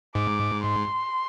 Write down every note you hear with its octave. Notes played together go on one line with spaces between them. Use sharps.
G#2 D6
C6